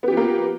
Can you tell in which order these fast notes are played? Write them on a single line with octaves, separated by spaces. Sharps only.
B3 G4 F3 A#3